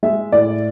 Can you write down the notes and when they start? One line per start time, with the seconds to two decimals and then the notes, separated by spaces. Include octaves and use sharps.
0.03 G#3 E5
0.32 A2 D5